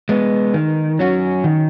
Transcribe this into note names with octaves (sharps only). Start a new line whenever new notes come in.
G#3 B3
D#3
F#3 C#4 F#4
D#3